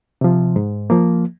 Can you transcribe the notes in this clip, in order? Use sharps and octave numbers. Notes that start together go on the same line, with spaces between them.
C3 F3
G#2
F3 A#3